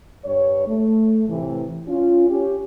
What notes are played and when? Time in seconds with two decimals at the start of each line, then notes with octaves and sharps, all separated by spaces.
0.24 G2 C#5
0.68 A3
1.28 A2 C3 E3
1.88 C#4 F4
2.29 C#4 G4